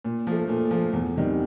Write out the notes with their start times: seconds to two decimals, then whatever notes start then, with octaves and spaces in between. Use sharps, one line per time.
0.05 A#2
0.27 F3 A3
0.49 A#2
0.71 F3 A3
0.93 E2
1.15 C3 D#3 G3